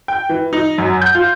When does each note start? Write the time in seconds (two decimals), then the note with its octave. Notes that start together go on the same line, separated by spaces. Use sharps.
0.08 G5
0.29 E3
0.53 D#4
0.78 F#2
1.02 G6
1.15 F4